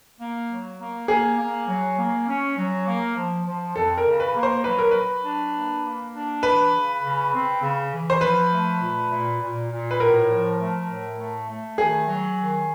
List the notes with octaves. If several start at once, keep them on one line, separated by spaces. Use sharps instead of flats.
A#3
F#3
A#3
A#3 G#4
A#3
F#3
A#3
C#4
F#3
A#3
F3
F3
F2 A4
A#4
C#3
B4
A#3
C5
F#3 B4
A#4
F#3 B4
D4
A#3
A#3
D4
E3 B4
C#3
C#3
C4
C#3
E3
C5
F3 B4
A3
A#2
A#2
A#2
A#2
B4
A2 A#4
F3
A3
A2
A3
A3
D#3 G#4
F#3
D#3